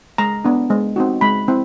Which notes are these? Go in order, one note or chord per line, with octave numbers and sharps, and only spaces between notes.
G#3 A#5
B3 D4
G#3
C4 D#4 F#4
G#3 B5
C4 E4